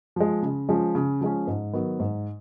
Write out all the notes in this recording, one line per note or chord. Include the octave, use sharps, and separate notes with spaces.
F3 G#3
C#3
F3 G#3 C#4
C#3
F3 G#3 C#4
G#2
D#3 F#3 B3
G#2